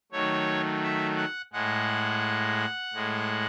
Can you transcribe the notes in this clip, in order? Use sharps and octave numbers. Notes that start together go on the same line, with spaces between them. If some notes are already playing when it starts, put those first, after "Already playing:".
D#3 F#3 A3 C#5
E5
F#5
A2 G#3 F#5
A2 G#3